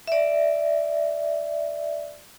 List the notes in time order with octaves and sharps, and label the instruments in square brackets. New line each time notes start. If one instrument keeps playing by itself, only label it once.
[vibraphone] D5 E5